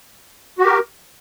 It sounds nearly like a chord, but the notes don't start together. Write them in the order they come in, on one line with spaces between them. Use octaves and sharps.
F#4 G4 A#4